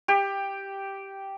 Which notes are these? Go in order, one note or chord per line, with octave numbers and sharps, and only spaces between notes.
G4